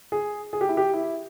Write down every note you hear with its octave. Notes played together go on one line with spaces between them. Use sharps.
G#4
G#4
G4
E4
G4
E4